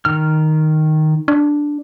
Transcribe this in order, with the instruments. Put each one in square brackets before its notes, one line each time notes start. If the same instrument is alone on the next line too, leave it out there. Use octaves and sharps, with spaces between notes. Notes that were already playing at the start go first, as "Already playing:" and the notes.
[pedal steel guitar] D#3 F6
[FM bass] D4